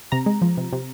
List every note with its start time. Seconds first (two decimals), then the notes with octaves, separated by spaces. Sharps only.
0.12 C3 A#5
0.26 G#3
0.42 F3
0.57 C3
0.73 C3